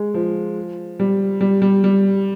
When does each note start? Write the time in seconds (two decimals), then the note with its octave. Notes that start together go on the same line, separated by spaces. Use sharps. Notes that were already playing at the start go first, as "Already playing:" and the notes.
Already playing: G#3
0.14 F3
0.99 G3
1.41 G3
1.62 G3
1.84 G3